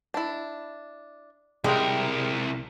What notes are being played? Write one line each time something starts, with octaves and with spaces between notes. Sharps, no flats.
D4 E4
C2 G3 G#3 A#4 G5